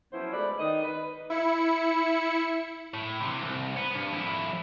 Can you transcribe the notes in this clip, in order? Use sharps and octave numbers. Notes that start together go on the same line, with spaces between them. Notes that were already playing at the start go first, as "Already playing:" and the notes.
F3 F#3 B3 C#4 E4 C5
G#3 A3 B4 D5
D#3 D#5
B4
E4 C#7
A2
C3 E3
C2
B3
G2
F2 E4